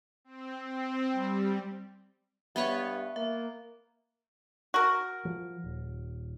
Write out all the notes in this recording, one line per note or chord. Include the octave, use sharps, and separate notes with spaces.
C4
C4
G3
G2 B3 B4 C#5 E5
A#3 E5
F#4 A#4
F3
D#1